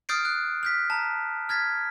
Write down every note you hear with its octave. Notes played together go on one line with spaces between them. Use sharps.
D#6 F6 G6 A6 C7 D7
F#6
F6 G6 B6
A5 A#5
F6 G#6 A6 B6